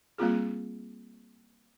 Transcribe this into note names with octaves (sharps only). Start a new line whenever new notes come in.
G3 A#3 C4 F4 G#4